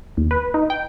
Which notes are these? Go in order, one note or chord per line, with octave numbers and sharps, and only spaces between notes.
D#2
B4
D#4
G5